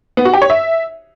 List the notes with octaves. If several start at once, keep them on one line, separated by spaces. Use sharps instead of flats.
B3
F#4
G4
C#5
E5